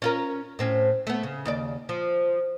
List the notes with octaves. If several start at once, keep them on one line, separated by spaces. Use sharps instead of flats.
C#4 F4 A#4
A2 C4 C#4
A3 B3
C#3
D#2 C#3 D5
F3